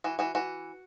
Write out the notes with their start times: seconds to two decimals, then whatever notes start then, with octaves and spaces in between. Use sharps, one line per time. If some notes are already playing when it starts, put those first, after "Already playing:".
0.04 E3 F#4
0.19 E3 F#4
0.35 E3 F#4